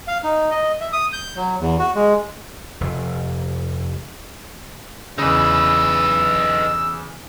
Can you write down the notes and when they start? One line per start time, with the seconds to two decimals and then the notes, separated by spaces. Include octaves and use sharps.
0.07 F5
0.24 D#4
0.51 D#5
0.80 E5
0.93 D#6
1.13 G6
1.36 F#3
1.60 E2
1.79 F#4
1.95 G#3
2.81 F1
5.18 E2 C#3 D#4 B4 E6